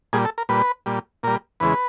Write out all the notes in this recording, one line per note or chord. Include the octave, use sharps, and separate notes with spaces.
A#2 G3 G#4
A4
A#4
A#2 G3 B4
A#2 G3
A#2 G3 A#4
E2 C#3 E3 G#3 B4